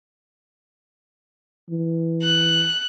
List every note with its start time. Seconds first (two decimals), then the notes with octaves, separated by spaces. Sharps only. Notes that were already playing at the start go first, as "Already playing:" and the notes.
1.69 E3
2.23 F#6